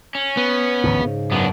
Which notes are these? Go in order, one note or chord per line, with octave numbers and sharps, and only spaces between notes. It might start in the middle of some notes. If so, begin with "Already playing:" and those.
C#4
B3
A1 D2 G#2
G#2 C#3
F#2 B3 D4